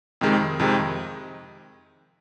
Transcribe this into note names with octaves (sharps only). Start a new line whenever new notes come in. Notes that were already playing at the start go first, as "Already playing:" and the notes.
F2 C3 D#3 G#3
F2 C3 D#3 G#3